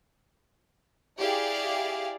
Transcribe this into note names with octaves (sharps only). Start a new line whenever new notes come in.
E4 G4 G#4 D5 F5